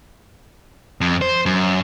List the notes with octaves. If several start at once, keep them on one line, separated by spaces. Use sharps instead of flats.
F2
C5
F#2